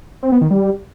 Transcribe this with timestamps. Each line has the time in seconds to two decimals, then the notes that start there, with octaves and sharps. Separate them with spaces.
0.23 C4
0.32 B3
0.41 D#3
0.51 G3